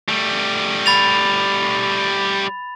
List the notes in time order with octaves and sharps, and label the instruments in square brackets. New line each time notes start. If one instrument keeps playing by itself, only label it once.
[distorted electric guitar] G3 A3
[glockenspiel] B5 A6 F7